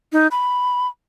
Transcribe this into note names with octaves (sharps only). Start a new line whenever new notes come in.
D#4
B5